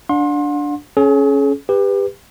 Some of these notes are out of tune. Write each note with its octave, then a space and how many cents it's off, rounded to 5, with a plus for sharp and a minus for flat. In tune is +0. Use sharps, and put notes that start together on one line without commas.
D4 -5 F#5 -40 C6 +25
C#4 +0 G#4 +40
G4 +25 B4 +0